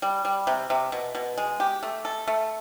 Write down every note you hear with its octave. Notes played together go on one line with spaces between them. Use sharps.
G3
G3
C3
C3
B2
B2
G#3
G4
A3
A4
A3